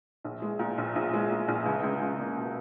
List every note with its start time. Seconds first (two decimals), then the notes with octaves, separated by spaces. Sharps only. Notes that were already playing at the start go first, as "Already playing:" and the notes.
0.25 A#1
0.42 G#3
0.59 A#2
0.78 A#1
0.96 A#1
1.14 G#3
1.31 A#2
1.48 A#1
1.66 C#2
1.83 C#2
2.01 C#2
2.19 A#3
2.37 B2